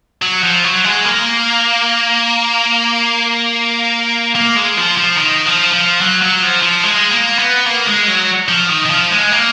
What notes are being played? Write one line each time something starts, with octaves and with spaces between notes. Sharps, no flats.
F#3
F3
F#3
G#3
A#3
A#3
G#3
F3
F3
D#3
F3
F3
F#3
F#3
F3
F3
G#3
A#3
B3
A#3
G#3
F#3
F3
D#3
D#3
F3
G#3
A#3